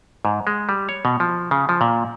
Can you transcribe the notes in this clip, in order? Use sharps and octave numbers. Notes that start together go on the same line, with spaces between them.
G#2
G#3
G3
C#5
B2
F3
C#3
F3
A#2